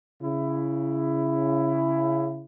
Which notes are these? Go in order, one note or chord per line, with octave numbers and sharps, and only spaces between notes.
C#3 E4